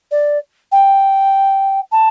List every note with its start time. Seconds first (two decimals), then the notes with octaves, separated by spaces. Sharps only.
0.11 D5
0.72 G5
1.92 A5